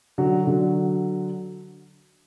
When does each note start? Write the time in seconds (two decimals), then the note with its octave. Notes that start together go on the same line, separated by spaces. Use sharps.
0.18 D3 F#3
0.47 D3 F#3